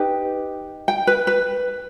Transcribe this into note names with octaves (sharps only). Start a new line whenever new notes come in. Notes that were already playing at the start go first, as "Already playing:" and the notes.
Already playing: D#4 G4 B4
G5
B4
B4